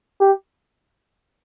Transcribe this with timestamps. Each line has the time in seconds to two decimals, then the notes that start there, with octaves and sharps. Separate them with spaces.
0.20 G4